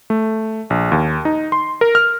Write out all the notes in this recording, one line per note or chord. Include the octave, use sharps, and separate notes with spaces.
A3
A#1
D#2
D#4
C6
A#4
F6